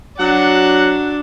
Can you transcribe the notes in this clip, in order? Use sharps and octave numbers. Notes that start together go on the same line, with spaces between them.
F#3 D4 F#5